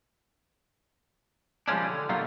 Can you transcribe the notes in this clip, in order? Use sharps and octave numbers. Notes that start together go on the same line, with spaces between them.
F3 G3 G#3 A#3 C#4 D4
D3
B2 F#3 G3 A3 A#3 F4